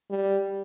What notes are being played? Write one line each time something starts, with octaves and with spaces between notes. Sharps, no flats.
G3